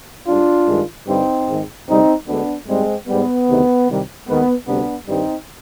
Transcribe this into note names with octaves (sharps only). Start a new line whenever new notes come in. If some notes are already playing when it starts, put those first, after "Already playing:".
G#2 G3 D4 F4
G2 D#3 G#3
G2 D3 G3 C4 D#4
G#2 D#3 G#3
D2 C3 G3 C4 D#4
D2 D3 G#3 B3 D4
G#2 G3 G#3 C4
G#2 G3 B3
D2 C3 D#3
C2 C3 D#3 G3
D#2 D#3 G#3 B3
D2 C3 G3 B3 D4
G2 D#3 G3 C4 D#4